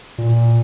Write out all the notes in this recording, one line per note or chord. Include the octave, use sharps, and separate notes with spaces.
A#2